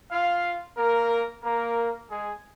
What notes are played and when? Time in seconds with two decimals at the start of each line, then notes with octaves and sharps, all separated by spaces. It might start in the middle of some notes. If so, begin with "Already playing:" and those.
0.10 F4 F5
0.77 A#3 A#4
1.43 A#3 A#4
2.09 G#3 G#4